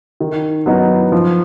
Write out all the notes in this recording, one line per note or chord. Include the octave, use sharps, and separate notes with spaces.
D#3
F#3 B3 D#4
F3